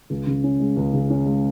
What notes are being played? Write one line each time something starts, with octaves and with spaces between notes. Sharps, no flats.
C#2
C#3
C#4
G#3
C#2
C#3
C#4
G#3